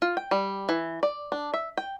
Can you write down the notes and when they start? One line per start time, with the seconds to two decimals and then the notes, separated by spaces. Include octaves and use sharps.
0.02 F4
0.17 G5
0.31 G3
0.69 E3
1.03 D5
1.32 D4
1.54 E5
1.77 G5